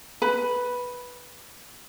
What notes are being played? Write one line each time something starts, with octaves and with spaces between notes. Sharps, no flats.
B4 B5